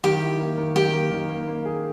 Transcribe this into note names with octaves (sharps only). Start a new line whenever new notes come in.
D#3 G4
E4
A#3
D#3
D#3 G4
A#3
D#3
A#3
A#3
G#4